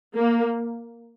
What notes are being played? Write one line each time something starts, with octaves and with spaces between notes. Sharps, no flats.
A#3